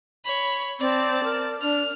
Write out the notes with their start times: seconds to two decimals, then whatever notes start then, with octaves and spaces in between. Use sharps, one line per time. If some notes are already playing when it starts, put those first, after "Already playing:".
0.25 C#5 B5
0.80 C4 D5 A5
1.24 A#4
1.61 D4 F6